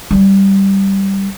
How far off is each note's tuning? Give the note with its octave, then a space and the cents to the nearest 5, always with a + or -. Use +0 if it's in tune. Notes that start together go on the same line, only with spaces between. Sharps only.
G3 -5